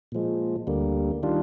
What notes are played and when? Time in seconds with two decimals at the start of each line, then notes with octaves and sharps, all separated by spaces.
0.12 A#2 F3 G#3
0.67 D2 D3 G3 A#3
1.23 D#3 G3 D4 F4